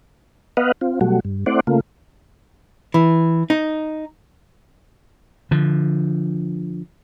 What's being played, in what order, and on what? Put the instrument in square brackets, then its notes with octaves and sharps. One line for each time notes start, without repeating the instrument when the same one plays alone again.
[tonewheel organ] B3 B4 D#5 F5 F#5
C4 F4
B2 F#3 G3 A3 F#4
G2
A3 C4 E4 C5 D5 F#5
C#3 A3 A#3 F4
[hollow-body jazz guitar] E3
D#4
[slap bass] D3 F3